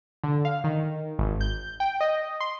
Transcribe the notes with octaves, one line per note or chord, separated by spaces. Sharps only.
D3
F5
D#3
G#1
G6
G5
D#5
C6